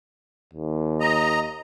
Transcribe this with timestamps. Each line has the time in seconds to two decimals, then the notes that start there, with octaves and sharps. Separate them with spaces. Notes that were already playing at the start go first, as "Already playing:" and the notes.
0.54 D#2
1.01 D#5 A#5